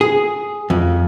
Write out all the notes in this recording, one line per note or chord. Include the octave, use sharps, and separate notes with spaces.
G#4
F2